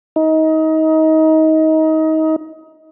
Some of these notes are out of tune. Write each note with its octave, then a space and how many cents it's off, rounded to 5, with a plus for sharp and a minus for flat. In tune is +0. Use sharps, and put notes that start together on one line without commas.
D#4 +25